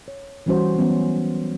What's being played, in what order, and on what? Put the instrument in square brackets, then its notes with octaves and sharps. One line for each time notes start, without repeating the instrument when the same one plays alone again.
[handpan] C#5
E3 G3 C#4 F#4 C5
E3 F#3 B3 C#4